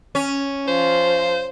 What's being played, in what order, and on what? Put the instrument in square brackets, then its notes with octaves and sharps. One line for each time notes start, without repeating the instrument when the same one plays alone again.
[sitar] C#4
[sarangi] F3 [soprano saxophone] C5